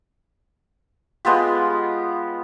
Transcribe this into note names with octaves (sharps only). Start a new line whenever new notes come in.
G#3 B3 F4 G4